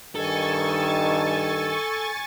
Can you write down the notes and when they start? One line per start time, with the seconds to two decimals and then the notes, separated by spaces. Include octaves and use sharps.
0.16 G2 D#3 A4 G#5 C#6 A6